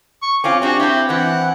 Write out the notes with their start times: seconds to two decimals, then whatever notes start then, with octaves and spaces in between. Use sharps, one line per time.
0.22 C#6
0.44 C4 C#4 F4 D6
0.62 C4 D4 F#4 G4
0.80 C4 E4 G4
1.09 E3 C4 F#5